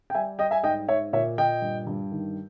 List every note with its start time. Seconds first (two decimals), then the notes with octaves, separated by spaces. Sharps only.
0.10 G5
0.14 G3 E5 G#5
0.39 G3 D#5 G5
0.51 E5 G#5
0.63 G#2 D#5 G5
0.88 G#2 C#5 E5
1.13 A#2 C#5 E5
1.38 A#2 D#5 G5
1.62 G2
1.87 G2
2.12 D#3